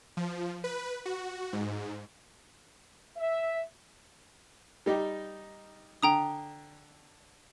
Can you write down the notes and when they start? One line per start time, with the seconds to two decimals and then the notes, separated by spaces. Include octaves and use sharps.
0.17 F3
0.64 B4
1.06 F#4
1.53 G#2
3.16 E5
4.86 G3 D#4 G4
6.03 D3 G5 A#5 D#6